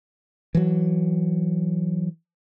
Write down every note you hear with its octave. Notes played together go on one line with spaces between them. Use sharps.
E3 F#3